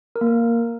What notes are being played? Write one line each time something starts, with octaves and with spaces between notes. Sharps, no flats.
A#4
A#3
A#4